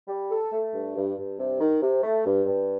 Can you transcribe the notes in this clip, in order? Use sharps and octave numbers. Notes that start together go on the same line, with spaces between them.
G3
A4
A3
G2
G2
G2
C3
D#3
C3
A3
G2
G2